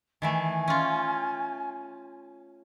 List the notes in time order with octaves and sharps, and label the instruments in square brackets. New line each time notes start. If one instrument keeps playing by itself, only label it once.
[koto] D#3 E3 A3 [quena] G#5
[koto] C#4 F4